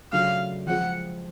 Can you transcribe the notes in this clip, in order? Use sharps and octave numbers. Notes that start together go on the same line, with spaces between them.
C#3 F#3 A3 D4 F4 F5
F3 G#3 C4 F4 F#5